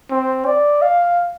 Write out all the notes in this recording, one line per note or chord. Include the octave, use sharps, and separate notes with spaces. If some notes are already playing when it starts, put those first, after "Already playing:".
C4
D5
F5